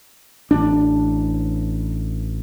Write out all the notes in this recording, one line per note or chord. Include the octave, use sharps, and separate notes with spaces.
A1 D4